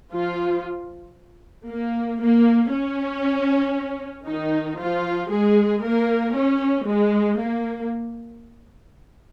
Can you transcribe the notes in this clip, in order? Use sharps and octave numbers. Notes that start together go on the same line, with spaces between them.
F3 F4
A#3
A#3
C#4
D#3 D#4
F3 F4
G#3 G#4
A#3 A#4
C#4
G#3
A#3